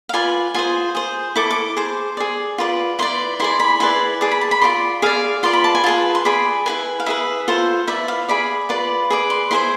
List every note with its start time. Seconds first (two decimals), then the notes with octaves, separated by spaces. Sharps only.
0.09 F5
0.14 F4 B4 D5 G#5
0.54 F4 G#4 C5 G#5
0.95 G#4 C5
1.36 E4 A4 D6
1.51 D6
1.77 G#4 C5
2.17 G#4 D5
2.58 F4 B4 D5
2.99 E4 B4 D5 C6
3.40 E4 G#4 D5 C6
3.60 B5
3.80 E4 G#4 B4 D5 C6
4.21 G#4 D5 A5
4.31 B5
4.41 A5
4.51 B5
4.61 F4 G#4 D5 C6
5.02 G#4 D5 F5
5.43 F4 B4 D5 C6
5.53 B5
5.64 A5
5.75 G#5
5.84 F4 G#4 B4 A5
6.15 C6
6.25 G#4 D5 B5
6.66 E4 G#4 B4 G#5
7.00 F5
7.06 E4 G#4 B4 E5
7.48 F4 A4 C5
7.87 E4 B4 D5 E5
8.08 F5
8.29 G#4 D5 B5
8.69 F4 B4 D5
9.10 G#4 B4 D5
9.30 C6
9.51 E4 G#4 C5 C6